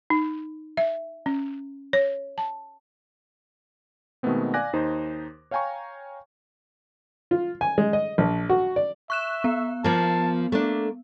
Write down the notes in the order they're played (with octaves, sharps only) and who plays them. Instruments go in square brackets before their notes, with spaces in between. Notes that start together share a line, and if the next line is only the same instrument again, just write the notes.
[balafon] D#4
E5
C#4
C#5
A5
[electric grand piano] B2 D#3 G#3 A3 B3 C4
D5 F5 G#5 D6 F#6 A#6
D#2 D#4 C5
C#5 F5 G5 G#5 A#5 C#6
[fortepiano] F4
G#5
G#3
D#5
A#1
F#4
D5
[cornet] E5 [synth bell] C#6 F#6 E7
[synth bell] B3
[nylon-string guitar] F3 A#3 [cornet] A5
[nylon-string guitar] A3 D4 [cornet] A#3